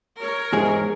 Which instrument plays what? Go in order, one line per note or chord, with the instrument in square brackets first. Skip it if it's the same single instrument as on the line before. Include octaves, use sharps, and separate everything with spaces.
[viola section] A#4 C#5
[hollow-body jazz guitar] E2 G#2 G#4